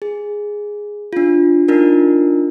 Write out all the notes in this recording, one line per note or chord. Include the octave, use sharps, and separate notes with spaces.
G#4
D4 F4
D4 D#4 F4 A#4